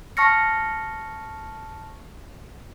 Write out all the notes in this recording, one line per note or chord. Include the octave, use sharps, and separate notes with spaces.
A5 C#6 F6 A#6 C#7